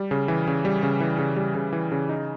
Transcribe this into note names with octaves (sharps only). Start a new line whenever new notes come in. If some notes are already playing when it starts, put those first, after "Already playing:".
Already playing: G3
C#3
E3
C#3
G3
C#3
E3
C#3
G3
C#3
E3
C#3
D#4